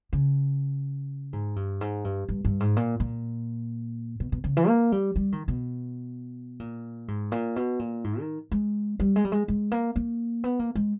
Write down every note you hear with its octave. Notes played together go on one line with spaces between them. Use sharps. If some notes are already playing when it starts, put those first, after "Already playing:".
C#3
G#2
G2
G#2
G2
G2
G2
G#2
A#2
A#2
B2
B2
C#3
E3
A#3
G3
G3
D#3
B2
A#2
G#2
A#2
B2
A#2
G#2
D#3
G#3
G3
G#3
G3
G#3
G#3
A#3
A#3
B3
A#3
G#3